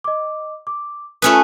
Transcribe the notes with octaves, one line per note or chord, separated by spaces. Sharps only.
D#5 D6
D6
A3 C#4 F4 B4 D#6